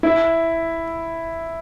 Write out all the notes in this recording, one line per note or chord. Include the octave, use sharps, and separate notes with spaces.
E4